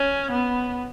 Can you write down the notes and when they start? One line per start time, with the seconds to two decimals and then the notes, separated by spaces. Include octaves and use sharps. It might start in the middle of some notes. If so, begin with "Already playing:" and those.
Already playing: C#4
0.31 B3